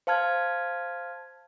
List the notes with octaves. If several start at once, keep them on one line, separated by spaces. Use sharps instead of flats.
C5 F5 A5 F6 G#6